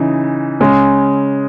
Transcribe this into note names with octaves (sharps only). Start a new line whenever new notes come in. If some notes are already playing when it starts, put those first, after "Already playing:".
Already playing: C#3 E3 D#4
C#3 G#3 C#4